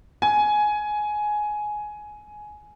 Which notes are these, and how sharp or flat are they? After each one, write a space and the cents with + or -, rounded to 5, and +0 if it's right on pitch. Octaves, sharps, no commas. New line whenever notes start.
G#5 +10